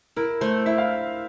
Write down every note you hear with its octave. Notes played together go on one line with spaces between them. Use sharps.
E4 A#4
A3 C5
E4 E5
F5